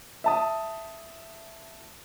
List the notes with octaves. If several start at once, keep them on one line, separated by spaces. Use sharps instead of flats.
E5 A5 D#6